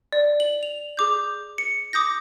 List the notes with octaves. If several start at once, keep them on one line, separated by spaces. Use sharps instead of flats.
D5
F#7
F7
G#4 D6 G6
C#7
D6 D#6 G6 A#6